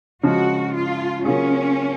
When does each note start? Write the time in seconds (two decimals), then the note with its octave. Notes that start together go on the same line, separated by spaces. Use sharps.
0.23 C#3 F3 G#3 F#4
0.74 F4
1.25 C#3 F#3 A#3 C#4 F4 G#4